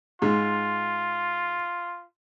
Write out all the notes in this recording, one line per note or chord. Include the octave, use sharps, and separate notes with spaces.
G#2 F4